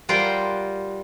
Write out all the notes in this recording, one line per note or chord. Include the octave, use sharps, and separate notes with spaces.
G3 F4 A#4 C5 F#5 G5